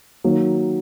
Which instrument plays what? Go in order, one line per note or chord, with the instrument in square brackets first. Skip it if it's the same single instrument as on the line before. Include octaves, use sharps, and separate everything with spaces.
[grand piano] D#3 F#3 A#3